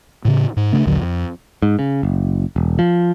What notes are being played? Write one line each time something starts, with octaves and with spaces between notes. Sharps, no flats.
A2 C#3
G#2
C#3 A3 D4
A#1 D#2 D3 F#3
F2
G#2
C#3
F#1
E1
F3